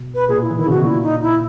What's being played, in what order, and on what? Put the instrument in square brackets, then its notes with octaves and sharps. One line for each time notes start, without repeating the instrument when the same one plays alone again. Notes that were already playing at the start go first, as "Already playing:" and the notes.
Already playing: [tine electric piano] B2
[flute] B4
[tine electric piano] A#2 [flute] G#4
[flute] E4
[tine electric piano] E3
[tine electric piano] D#3 [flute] E4
[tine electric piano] C#3 [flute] F#4
[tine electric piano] B2
[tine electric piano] A#2 [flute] E4
[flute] D#4
E4